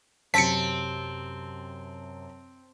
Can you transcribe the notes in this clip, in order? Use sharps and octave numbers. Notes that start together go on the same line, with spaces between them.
F#2 C3 C4 A5 B6 C#7